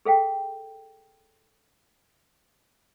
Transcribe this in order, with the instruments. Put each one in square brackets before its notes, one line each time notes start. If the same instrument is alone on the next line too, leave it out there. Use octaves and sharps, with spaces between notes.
[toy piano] G#4 A4 F5 G5